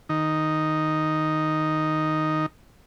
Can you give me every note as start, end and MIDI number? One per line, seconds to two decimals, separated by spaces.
0.09 2.46 51
0.09 2.46 63